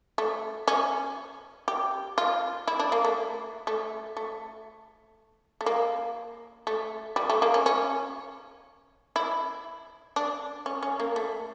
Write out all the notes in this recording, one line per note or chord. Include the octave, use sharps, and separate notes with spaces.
A3
C#4
G4
F4
E4
D4
A#3
A3
A3
A3
A3
A#3
A3
G3
A3
A#3
C#4
C#4
E4
D4
C#4
C#4
A#3
A3